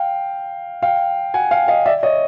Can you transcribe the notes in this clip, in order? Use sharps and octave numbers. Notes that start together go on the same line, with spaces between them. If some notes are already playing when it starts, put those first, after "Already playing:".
Already playing: F5 G5
F5 G5
F#5 G#5
F5 G5
D#5 F5
D5 E5
C#5 D#5